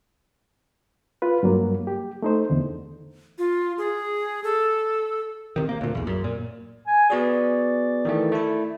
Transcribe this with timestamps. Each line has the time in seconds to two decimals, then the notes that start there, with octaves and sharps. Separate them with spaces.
1.22 F4 B4
1.43 G2 F#3 A#3
1.87 G4
2.22 A3 D#4 C5
2.50 E2 D3
3.38 F4
3.78 G#4
4.44 A4
5.56 C3 D#3
5.69 A#3
5.81 D2 A#2
5.95 B1 E2
6.07 F#2
6.24 A#2
6.87 G#5
7.10 B3 F#4 G#4 D5
8.05 D#3 E3 A3
8.32 A3 E4